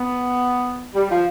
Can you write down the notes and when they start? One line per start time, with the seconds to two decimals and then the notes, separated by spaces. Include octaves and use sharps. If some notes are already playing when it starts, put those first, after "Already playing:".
Already playing: B3
0.94 G3
1.10 F3